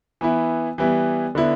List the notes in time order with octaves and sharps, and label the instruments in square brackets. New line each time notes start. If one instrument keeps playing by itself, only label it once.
[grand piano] E3 B3 E4
E3 G3 B3 E4
D3 B3 E4